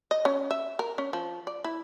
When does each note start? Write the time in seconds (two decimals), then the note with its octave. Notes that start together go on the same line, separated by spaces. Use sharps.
0.11 D#5
0.25 C#4
0.51 E5
0.79 A#4
0.98 C#4
1.13 F3
1.47 D5
1.64 E4